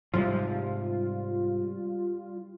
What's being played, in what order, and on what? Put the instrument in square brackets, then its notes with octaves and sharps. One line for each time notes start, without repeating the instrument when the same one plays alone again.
[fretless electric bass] G#2 C3 F3 [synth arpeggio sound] G3 F4